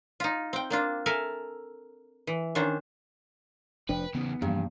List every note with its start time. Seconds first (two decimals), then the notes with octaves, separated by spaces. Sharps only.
0.20 D#4 F4
0.53 C4 G5
0.70 A#3 D4 F4
1.06 A4 A#4 E5 G#5 A5
2.27 E3
2.55 D#3 C#4 D4 C5
3.89 F1 F3 D4 B4 G5
4.15 E2 C#3 B3 D#4
4.42 E2 G2 C3 F3 A#3